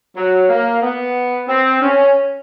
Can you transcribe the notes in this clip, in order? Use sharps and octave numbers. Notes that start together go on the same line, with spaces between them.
F#3
A#3
B3
C4
C#4